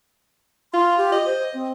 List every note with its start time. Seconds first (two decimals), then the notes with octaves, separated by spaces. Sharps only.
0.74 F4 C6
0.97 G4
1.12 D#5
1.26 C5
1.54 C4